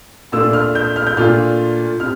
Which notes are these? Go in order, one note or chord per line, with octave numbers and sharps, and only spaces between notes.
A#2 A3 D4 F4 E6
F6
G6
F6
G6
A#2 A3 D4 F4 F6
C3 F6